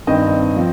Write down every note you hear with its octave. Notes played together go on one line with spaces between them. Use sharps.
G2 D#3 C4 D#5
F3 C4